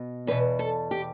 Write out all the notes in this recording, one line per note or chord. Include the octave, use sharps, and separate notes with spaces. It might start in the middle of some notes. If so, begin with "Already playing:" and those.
Already playing: B2
E2 B2 B4
A4
G4